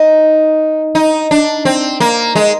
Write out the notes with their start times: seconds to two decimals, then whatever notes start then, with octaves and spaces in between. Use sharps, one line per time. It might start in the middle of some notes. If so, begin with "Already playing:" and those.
Already playing: D#4
0.95 D#4
1.31 D4
1.65 C4
2.00 A#3
2.36 G#3